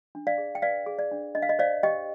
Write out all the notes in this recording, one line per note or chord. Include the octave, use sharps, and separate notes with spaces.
D4
D5 F5
G#4
G5
B4 D5 F5
G#4
D5
D4
D4 D#5
F5
D#5
C5 D5 F5
G4 D#5 G5